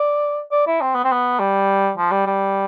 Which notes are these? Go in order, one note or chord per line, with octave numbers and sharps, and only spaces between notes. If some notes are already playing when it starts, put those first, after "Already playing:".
Already playing: D5
D5
E4
C4
B3
C4
B3
G3
F3
G3
G3